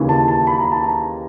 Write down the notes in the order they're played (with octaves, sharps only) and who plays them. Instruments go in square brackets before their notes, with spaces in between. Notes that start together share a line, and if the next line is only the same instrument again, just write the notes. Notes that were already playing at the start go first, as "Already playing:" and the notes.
Already playing: [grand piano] D#2 C#3 E3
A5
A5
B5
A#5
A5
A#5